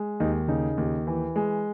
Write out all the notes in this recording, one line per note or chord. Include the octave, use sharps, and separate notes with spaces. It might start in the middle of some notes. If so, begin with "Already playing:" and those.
Already playing: G#3
D#2 D#4
C#3 D#4
D#2
E3
G#3